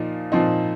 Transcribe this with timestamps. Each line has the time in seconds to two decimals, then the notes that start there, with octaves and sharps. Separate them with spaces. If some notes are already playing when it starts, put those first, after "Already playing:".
Already playing: A#2 F3 D#4
0.32 A#2 F3 C4 D#4